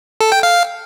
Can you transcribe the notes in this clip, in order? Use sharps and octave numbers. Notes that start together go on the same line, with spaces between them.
A4
G5
F5